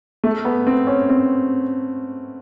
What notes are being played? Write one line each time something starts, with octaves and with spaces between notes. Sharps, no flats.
A3
B3
C4
C#4
C4